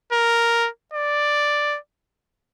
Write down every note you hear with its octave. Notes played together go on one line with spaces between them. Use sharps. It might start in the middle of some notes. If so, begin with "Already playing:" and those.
A#4
D5